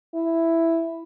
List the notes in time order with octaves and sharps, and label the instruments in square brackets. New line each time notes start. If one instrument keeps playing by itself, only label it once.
[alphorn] E4